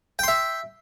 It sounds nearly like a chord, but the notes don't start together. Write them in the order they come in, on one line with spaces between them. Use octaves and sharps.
G5 C6 E5